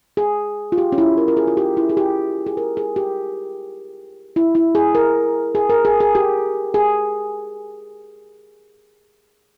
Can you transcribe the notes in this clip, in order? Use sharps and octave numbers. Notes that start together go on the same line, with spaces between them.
G#4
F4
G4
C#4
E4
A#4
A#4
G#4
F4
G4
E4
G#4
G4
G#4
A#4
G#4
G4
E4
E4
G#4
A#4
G#4
A#4
G#4
G#4
G4
G#4